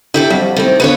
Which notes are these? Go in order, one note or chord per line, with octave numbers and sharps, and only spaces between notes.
D3 E4 G4 A4
F2 G3 F#4
D#3 G3 A3 C4 E4
D3 B3 F4 B4 C#5